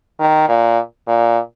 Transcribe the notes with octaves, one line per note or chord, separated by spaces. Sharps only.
D#3
A#2
A#2